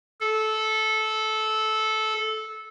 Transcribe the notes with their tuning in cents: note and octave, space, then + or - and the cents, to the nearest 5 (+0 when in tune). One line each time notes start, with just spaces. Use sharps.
A4 -15